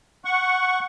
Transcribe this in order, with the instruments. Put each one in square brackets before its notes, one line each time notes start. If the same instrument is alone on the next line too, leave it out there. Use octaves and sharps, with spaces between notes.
[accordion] F#5 C#6